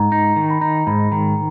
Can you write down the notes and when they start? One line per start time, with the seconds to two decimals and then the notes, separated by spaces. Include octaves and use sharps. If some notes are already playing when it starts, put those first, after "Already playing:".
Already playing: G#2 A#5
0.12 D#4
0.36 D#3
0.50 B5
0.61 D#4 A#5
0.87 G#2 B5
1.12 D#3 A#5